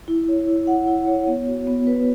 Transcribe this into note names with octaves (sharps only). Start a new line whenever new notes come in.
E4
C#5
E4
F#5
E4
C#5
B3
F#4
B3
B4